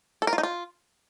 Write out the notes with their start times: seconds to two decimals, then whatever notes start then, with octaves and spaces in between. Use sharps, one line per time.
0.22 A4
0.27 A#4
0.33 F4
0.38 D#4
0.43 F4